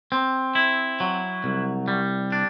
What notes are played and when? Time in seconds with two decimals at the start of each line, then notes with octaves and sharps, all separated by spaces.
0.12 C4
0.55 E4
1.00 F#3
1.44 C2
1.88 G3
2.32 D4